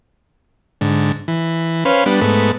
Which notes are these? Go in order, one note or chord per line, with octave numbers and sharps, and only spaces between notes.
G#2 D3
E3
C#4 B4 C5 F5
G3 B3 D4
G#2 A3 B3